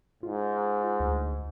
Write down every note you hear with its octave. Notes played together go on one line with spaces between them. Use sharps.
G#2 F4
D2